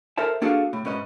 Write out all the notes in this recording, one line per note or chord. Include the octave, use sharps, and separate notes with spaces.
A4 A#4 C5 E5 A5
A#3 D4 F#4 G#4 A4 F5
A2
G#2 C#4 B4 D#5